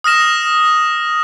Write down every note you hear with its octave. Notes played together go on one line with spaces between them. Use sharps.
D#6 F6 A#6 E7